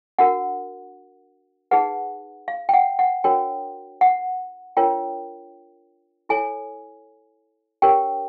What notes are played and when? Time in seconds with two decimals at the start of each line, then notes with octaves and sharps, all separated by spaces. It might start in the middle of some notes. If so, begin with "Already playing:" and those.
0.19 D4 F#4 A#4 F#5
1.71 D#4 G#4 B4 F#5
2.48 F5
2.69 G5
2.74 F#5
2.99 F#5
3.24 D4 F#4 A#4 C#5 G5
4.01 F#5
4.77 D4 F4 A#4 C#5 G5
6.29 E4 A4 C#5 G#5
7.82 D4 G4 A#4 C#5 G5